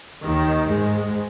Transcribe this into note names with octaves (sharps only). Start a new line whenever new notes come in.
D#2 D#3
G#2 G#3